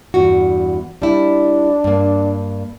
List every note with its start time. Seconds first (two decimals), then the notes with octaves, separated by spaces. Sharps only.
0.14 E2 G2 F#4
1.02 G3 D4 E4
1.84 G2 A#3